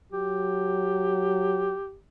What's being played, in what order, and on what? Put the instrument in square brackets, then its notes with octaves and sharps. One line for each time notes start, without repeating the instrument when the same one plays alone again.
[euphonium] F#3 [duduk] G4